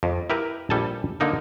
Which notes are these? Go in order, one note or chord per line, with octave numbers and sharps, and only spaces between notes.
F2
E4 G4 A#4 B4
A#1 G3 A4 G#5 A5
D3 A#3 D#4 A#4